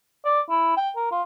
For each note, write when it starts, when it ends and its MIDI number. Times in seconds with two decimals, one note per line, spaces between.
0.25 0.40 74
0.50 0.73 64
0.77 0.90 79
0.96 1.09 70
1.12 1.22 65